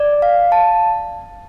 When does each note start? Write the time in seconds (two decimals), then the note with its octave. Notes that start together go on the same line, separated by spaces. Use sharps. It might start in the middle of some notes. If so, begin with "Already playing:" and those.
Already playing: D5
0.22 F5
0.52 A5